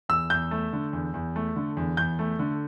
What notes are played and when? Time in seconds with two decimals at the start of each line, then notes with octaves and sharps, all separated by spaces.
0.09 E2 E6
0.30 E2 G6
0.51 A3
0.73 D3
0.93 E2
1.14 E2
1.36 A3
1.56 D3
1.77 E2
1.97 E2 G6
2.19 A3
2.39 D3